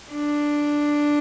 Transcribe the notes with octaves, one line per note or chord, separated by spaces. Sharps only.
D4